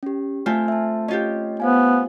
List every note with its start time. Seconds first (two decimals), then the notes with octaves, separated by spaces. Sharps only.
0.03 C#4 G4
0.46 A3 C4 F4 G#5 F6
0.68 E5 A5
1.08 C#4 F4 G4 D#5
1.60 B3 C5 F5 G#5